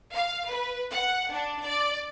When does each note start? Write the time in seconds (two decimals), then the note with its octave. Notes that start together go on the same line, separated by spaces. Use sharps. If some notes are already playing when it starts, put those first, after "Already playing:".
0.13 F5
0.48 B4
0.92 F#5
1.33 D4
1.64 D5